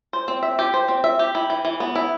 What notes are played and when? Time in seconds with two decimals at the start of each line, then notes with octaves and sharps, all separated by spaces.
0.13 C5
0.28 C4
0.43 E5
0.59 G4
0.74 C5
0.88 C4
1.04 E5
1.19 G4
1.35 E4
1.50 E3
1.65 E3
1.80 B3
1.96 E4